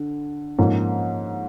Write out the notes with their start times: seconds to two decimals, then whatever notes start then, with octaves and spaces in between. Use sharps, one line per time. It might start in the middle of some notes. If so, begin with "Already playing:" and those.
Already playing: D3
0.58 G#2 F3 A#3 C#4